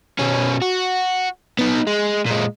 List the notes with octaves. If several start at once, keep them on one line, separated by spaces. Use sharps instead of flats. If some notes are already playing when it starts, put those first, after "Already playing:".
B2 C#4
F#4
B3 D#4
G#3
A#2 G#3